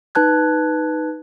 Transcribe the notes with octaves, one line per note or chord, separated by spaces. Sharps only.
D#4 B4 A5 F#6 G#6